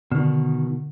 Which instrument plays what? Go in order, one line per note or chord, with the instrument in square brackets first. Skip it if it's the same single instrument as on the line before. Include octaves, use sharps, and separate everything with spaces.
[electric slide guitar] B2 D#3 [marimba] D3